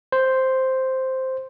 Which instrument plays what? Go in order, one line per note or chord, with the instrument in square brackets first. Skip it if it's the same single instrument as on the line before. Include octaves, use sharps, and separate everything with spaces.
[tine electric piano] C5